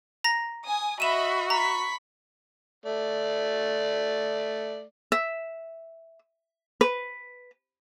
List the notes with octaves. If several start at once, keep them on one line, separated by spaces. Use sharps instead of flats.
A#5 A#6
G#5 D#6
F#4 D#5 E5 B5 D#7 E7
A#5 B5 C#6 B6
A3 D5
E5
B4